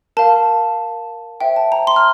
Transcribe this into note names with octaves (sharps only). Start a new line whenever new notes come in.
A#4 F5 A5
C5 E5 G5
A5
A#5
C6
F6